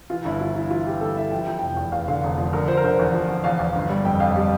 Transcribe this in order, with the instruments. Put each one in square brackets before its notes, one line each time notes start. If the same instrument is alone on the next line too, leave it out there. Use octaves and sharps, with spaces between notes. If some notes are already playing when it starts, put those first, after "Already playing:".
[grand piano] E3 F4
G1 E4
E3 F4
E3 E4
E3 F4
E3 G4
G1 A4
E3 E5
F3 G5
F3
F1 G5
E2
E2 F5
D3 F5
F1
F3
D3 A#4
F3 C5
A#4
D3 C5
E2
F3
E2
E2 F5
E2
G1
G3
F2 G5
F2 F5
G3 G4